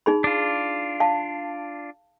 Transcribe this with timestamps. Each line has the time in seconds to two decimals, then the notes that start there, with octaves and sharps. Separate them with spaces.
0.06 D#4 G#4 B5
0.24 D4 F4
1.00 F5 A5